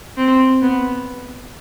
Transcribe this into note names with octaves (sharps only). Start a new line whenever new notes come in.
C4
B3